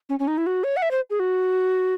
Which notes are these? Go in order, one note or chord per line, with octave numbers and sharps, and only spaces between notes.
C#4
C#4
D#4
E4
F#4
C#5
F#5
E5
C5
G#4
F#4